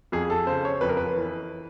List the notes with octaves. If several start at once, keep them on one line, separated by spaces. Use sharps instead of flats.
F2 G#4
A4
C#3 C5
C#5
F2 B4
A#4
B4
E3